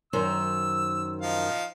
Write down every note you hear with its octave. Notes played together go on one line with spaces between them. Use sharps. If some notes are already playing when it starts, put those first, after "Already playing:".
F#2 D#3 C5 E6
F3 D#4 F5